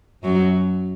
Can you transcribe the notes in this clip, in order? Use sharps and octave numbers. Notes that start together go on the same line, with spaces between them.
F#2 F#3